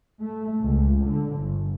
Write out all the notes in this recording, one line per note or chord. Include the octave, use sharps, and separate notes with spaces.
A3
C#2
D3
G1